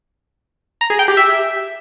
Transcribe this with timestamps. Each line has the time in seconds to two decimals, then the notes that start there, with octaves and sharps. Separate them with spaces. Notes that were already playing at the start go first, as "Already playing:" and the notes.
0.81 A#5
0.90 G#4
0.99 G5
1.08 G4
1.17 E5